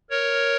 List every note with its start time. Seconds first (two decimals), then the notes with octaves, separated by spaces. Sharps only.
0.10 A#4 C#5